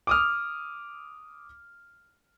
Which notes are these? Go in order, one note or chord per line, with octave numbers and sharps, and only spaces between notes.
D6 D#6 F6